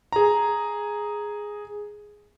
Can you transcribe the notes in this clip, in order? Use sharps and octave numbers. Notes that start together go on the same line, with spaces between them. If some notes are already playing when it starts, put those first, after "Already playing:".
G#4 A#5